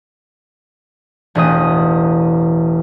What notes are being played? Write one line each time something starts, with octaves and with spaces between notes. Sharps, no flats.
E1 A1 D#5 D#6